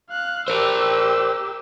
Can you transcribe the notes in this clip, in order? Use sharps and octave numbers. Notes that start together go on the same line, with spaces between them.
F5 F#6
G4 A#4 C5 E6